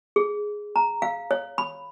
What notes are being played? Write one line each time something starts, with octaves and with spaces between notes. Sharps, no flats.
G#4
A#5
F5
C#5
B5